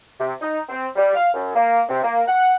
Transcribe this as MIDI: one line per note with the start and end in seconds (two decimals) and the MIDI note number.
0.19 0.32 48
0.41 0.58 63
0.69 0.87 60
0.96 1.15 55
1.15 1.28 77
1.34 1.52 42
1.54 1.81 58
1.89 2.01 48
2.02 2.21 58
2.27 2.56 78